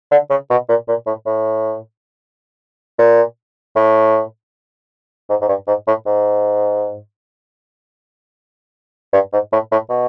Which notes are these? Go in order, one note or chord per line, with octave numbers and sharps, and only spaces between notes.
D3
C#3
B2
A#2
A#2
A2
A2
A#2
A2
G#2
G#2
G2
G#2
A2
G#2
G2
G#2
A2
A2
B2